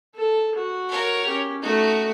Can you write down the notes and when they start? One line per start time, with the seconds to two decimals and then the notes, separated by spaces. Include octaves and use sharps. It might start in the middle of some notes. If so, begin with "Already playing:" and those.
0.15 A4
0.56 F#4
0.89 A#4 C#5
1.25 C#4 G4
1.62 A3 D#4 F#4